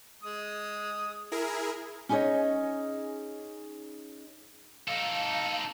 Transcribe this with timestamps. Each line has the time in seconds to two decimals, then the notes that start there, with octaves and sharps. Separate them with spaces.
0.23 G#3 D#6
1.32 E4 G#4 A#4
2.09 C#4 D#4 G#4 A#4 C#5 D#5
4.88 D#4 A4 F5